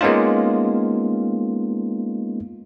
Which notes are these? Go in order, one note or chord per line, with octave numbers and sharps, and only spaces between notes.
G#3 A#3 B3 C#4 D#4 F4